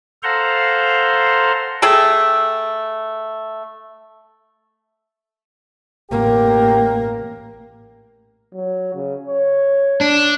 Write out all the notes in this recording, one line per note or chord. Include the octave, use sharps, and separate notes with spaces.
A4 C5 F5 F#5 A#5 C6
A3 G#4 A4 G5
A1 A#3 G4
F#3
C#3
C#5
D4